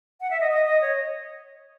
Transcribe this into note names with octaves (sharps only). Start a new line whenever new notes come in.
F#5
E5
D#5
D#5
D#5
C#5